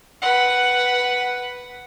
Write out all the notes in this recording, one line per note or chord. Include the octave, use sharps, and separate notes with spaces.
B4 F#5